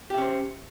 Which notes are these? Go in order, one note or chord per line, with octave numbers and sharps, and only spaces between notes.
C#4 G4 C5 E5